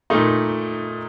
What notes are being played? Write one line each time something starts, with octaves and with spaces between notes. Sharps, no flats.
A#2 A3 D#4